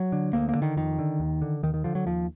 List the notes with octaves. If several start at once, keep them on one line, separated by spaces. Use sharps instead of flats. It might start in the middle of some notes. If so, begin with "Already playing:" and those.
Already playing: F#3
D3
D2 A#3
A#3
D3
D#3
F2 D#3
D3
D#2
D3
D#2 D#3
D#3
D3 F3
F#3
D#2 F3